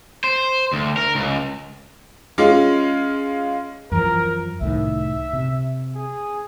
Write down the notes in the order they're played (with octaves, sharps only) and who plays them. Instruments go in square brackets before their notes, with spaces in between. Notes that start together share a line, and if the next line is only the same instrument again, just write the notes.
[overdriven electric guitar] C5
D2
A#4
C#2
[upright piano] G#3 C#4 F4
[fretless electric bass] F#2 E3 F3 [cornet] A#4
[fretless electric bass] C2 A2 D#3 [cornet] E5
[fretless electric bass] C3
[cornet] G#4